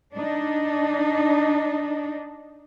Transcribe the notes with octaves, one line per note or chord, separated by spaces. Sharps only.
D4 D#4